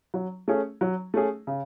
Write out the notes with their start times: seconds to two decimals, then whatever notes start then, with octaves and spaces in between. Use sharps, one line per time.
0.14 F#3
0.48 A3 C#4 G#4
0.81 F#3
1.14 A3 C#4 G#4
1.47 C#3